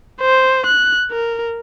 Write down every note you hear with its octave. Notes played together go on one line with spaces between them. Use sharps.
C5
F#6
A#4